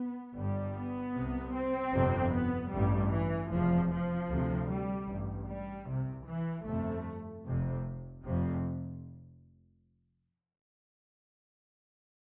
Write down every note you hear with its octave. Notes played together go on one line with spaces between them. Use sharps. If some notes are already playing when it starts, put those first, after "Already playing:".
Already playing: B3
G1 G2 G3
B3
C2 C3
C4
G1 F2 C3
B3
A1 G2 G3
E3
F1 E2 C3 F3
F3
D2 C3
G3
A1 G2
G3
C2 C3
E3
G1 F2 C3 A3
F1 F2 C3
F1 F2 C3